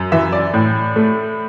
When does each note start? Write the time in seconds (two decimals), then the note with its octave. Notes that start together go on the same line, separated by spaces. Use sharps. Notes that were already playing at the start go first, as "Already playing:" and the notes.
Already playing: F#2
0.12 E3 E5
0.32 D5
0.54 A2
0.96 A3